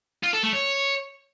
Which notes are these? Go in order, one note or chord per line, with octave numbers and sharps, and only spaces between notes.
F4
A4
A3
C#5